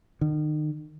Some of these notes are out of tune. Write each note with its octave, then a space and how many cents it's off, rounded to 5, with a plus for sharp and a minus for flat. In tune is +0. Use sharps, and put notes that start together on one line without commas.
D#3 -35